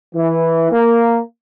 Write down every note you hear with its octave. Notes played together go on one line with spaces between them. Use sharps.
E3
A#3